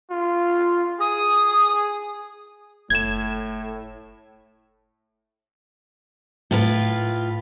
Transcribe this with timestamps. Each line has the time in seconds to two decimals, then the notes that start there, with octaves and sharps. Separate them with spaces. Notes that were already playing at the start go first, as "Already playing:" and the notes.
0.11 F4
1.00 G#4 D#6
2.90 F#1 A2 A3 G#6 E7
6.51 A2 F4 B4